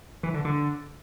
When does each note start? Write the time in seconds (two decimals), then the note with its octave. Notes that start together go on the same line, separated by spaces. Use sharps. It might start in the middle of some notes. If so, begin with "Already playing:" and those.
0.23 E3
0.34 D3
0.45 D3